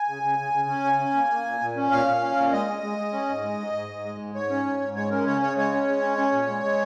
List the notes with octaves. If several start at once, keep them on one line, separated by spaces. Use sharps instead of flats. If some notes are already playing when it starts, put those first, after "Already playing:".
Already playing: G#5
C#3
C#3
C#3
C#3
C#4
C#3
C#4
A#3
A#3
A#2
A#2
C#4
A#2 F5
A#2
C#4
A#2
G#3 D#5
G#3
G#3
G#3
C#4
G#2
G#3
G#2
G#2
G#2
G#3
G#2
G#2 C#5
C#4
G#2
G#2
G#3 C#5
C#4 A#4
C#3 C#5
C#3 C#5
G#3 C#5
C#4
G#3
C#4
C#4
A#2
G#3
G#3